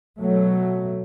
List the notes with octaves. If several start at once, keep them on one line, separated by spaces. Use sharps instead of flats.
B2 F#3 A3